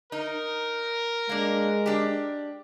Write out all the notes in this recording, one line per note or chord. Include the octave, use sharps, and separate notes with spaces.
D#4 A#4
G#3 A#3 D4
D4 G4